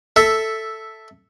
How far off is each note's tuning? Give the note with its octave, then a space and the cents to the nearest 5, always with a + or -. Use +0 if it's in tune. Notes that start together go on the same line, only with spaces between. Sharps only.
A4 +5 E5 +0